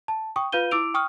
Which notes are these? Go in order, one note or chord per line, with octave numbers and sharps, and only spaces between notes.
A5
G5 C#6 D#6
F4 B4 F5 G6 D#7 G7
E4 D6 E6 D7 F7
G5 C#6 D#6 F6